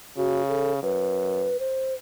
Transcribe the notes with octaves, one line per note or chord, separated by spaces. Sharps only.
C#3 F#4
A4
F#2 B4
C5